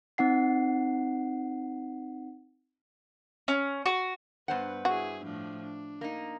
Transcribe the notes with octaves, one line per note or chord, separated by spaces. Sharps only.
C4 D#4 F#5 C7
C#4
F#4
G2 B3 B4 C5 F#5
D4 E4 F#4 G#4
A2 F3 D4
D4
A#3 D#4